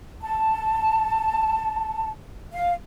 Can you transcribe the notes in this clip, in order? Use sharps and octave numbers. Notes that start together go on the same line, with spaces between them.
A5
F5